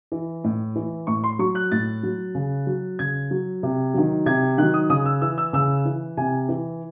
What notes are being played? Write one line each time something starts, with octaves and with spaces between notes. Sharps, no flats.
E3
A2
E3
A2 C#6
C6
F#3 C#6
F#6
A2 A6
F#3
C#3
F#3
C#3 G#6
F#3
C3
D#3 F#3
C3 G#6
D#3 F#3 F#6
D#6
C#3 D#6
E6
E3 E6
E6
C#3 E6
E3
C3 G#5
E3